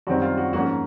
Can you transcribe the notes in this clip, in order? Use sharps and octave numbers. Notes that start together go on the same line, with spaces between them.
F#2 D#3 G3 C4 F#4
F4
F#4
G#2 F3 A#3 C#4 F#4